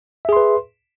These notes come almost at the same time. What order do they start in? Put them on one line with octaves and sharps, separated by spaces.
E5 G#4 C6 B4